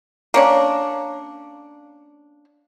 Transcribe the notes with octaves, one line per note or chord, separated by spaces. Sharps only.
A#3 C#4 D4